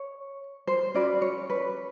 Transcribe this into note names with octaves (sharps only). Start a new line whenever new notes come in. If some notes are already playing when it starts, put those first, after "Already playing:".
Already playing: C#5
C5
C#4 F#4 B4 D5
C#5
B4